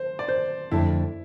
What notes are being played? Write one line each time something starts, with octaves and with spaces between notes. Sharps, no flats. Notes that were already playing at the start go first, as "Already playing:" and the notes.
Already playing: C5
D5
C5
F2 D3 A3 D4 E4 A4